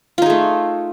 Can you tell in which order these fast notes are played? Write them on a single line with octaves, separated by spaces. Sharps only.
F4 D#4 G#4 A3